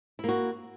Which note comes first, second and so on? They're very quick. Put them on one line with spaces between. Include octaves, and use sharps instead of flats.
E4 A#3 F#4